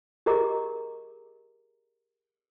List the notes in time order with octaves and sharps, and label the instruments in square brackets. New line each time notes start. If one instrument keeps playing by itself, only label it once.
[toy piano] G4 G#4 A#4 D#5 A#5 D6